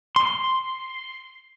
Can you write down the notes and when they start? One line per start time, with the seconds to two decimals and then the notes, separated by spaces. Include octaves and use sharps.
0.16 C6